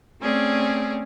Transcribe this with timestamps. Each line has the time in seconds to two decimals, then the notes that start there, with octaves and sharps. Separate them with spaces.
0.20 A3 C4 C#4 G#4 D5